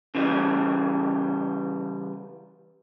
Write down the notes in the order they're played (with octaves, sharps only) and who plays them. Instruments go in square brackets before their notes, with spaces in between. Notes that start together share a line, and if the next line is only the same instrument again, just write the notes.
[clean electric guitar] C#3 E3 G3